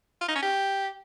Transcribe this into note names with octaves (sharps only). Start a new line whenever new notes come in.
F4
D#4
C#4
G4